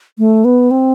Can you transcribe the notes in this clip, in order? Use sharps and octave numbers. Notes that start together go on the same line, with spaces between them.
A3
B3
C4